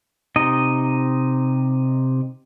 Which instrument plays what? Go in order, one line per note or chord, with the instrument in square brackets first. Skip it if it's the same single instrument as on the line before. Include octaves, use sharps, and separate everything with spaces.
[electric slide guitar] C3 D#4 D#5